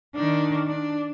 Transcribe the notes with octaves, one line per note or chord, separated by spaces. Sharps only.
D#3 D4
D4